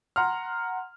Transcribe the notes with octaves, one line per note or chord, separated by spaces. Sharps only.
F#5 A#5 C6 F6